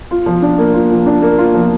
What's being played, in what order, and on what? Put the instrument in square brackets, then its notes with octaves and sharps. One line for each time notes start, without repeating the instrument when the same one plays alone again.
[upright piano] F4
F3
D4
A#3
F4
F3
D4
A#3
F4
F3